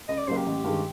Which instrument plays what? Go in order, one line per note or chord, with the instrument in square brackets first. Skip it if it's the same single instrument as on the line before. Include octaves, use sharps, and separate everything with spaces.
[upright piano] C#2 [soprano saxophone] D#5
[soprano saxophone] D5
[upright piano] C#3 F#3 A#3 [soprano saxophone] C5
[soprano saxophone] G4
[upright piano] A1
G2 D#3 G#3